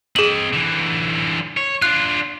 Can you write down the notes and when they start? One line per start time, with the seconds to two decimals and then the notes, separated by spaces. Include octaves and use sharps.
0.16 C4 G#4 D#5 F#7
0.53 D3 E3
1.57 C#5
1.82 D4 F4 F#6